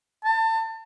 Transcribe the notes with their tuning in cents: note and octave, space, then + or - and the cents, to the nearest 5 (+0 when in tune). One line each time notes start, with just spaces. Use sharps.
A5 +30